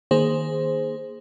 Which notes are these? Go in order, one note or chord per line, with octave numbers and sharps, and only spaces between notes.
D#3 A#3 G#4 C5